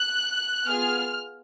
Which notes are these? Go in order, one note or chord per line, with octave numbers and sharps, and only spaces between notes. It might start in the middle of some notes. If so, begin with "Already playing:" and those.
Already playing: F#6
B3 F4 G#4 F6